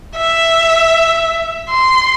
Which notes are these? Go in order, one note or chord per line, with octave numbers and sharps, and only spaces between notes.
E5
C6